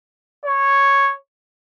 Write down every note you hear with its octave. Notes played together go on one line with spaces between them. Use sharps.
C#5